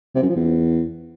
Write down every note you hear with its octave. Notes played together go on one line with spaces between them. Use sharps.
C3
F#2
F3
E2